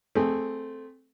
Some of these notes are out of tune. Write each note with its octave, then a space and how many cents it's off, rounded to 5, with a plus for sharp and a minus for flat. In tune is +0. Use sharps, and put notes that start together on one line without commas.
A3 +0 C4 +0 G#4 -15